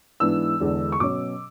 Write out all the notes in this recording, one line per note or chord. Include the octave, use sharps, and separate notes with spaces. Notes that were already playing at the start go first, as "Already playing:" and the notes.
G#2 E3 B3 D4 E6
E2 D3 G#3 D4
C#6
B2 F#3 C#4 D6